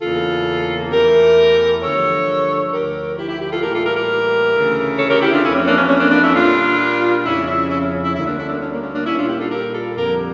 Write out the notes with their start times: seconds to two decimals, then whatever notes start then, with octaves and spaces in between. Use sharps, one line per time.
0.01 E2 C#3 E3 A#3 F4 A4
0.91 E2 E3 A3 G4 A#4
1.82 G2 D3 F3 A3 A4 C#5
2.72 D2 D3 F3 G4 A#4
3.18 E4 G4
3.29 E4 G4
3.40 E4 G4
3.52 F4 A4
3.63 A2 E3 G3 A#3 G4 A#4
3.74 F4 A4
3.85 G4 A#4
3.97 G4 A#4
4.54 D2 C#3 E3 A3
4.99 A4 C#5
5.10 G4 A#4
5.21 E4 G4
5.32 D4 F4
5.44 F2 E3 A3 C#4 E4
5.55 C#4
5.67 A#3 D4
5.78 C#4
5.89 C#4
6.01 A#3 D4
6.12 A#3 D4
6.23 C#4 E4
6.34 A#2 G3 A#3 D4 F4
7.25 F2 C#3 F3 C#4 E4
7.47 C#4 E4
7.71 C#4 E4
7.82 C#4
8.04 C#4 E4
8.15 D2 D3 G3 A#3 C#4 E4
8.26 A#3 D4
8.38 C#4 E4
8.49 A#3 D4
8.60 C#4
8.72 A#3
8.83 C#4
8.94 A#3 D4
9.06 A#2 G3 A#3 C#4 E4
9.18 D4 F4
9.28 E4 G4
9.40 F4 A4
9.51 G4 A#4
9.74 F4 A4
9.96 F2 D3 G3 A#3 G4 A#4